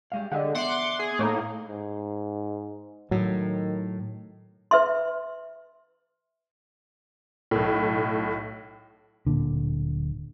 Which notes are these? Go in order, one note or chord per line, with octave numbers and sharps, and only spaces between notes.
G3 G#3 F5
D3 G4 G#4 D#5
B3 D5 E5 F#5 C6 D6
G#4
A2 A3 A#3 D#4
G#2
A2 D#3 F#3
B4 E5 C6
B1 A2
D1 A#2 D3